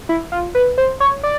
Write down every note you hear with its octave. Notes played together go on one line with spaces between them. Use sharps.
E4
F4
B4
C5
C#5
D5